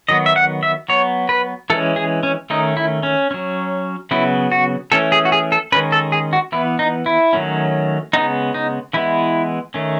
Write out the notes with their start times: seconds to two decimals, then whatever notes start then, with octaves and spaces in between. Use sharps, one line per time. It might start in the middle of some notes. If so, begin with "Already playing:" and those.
0.09 D#3 F#3 B3 D#5
0.26 E5
0.36 F#5
0.63 E5
0.89 F#3 B3 C#5
1.29 B4
1.70 E3 G#3 C#4 A4
1.96 G#4
2.23 C#4
2.50 D#3 A3 C#4 D#4
2.77 E4
3.03 C#4
3.31 F#3 C#4
4.11 C#3 F#3 B3 E4
4.52 F#4
4.92 E3 A3 C#4 A4
5.12 G#4
5.25 F#4
5.32 G#4
5.52 A4
5.72 D#3 G#3 C#4 B4
5.92 A4
6.12 G#4
6.33 F#4
6.52 E3 B3 E4
6.79 D#4
7.06 E4
7.33 D#3 F#3 A3 C#4
8.13 C#3 G#3 B3 D#4
8.54 D#4
8.93 E3 G#3 B3 E4
9.74 D#3 A3 C#4